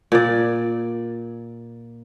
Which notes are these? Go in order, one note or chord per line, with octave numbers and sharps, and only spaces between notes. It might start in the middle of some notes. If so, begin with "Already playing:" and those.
A#2 D5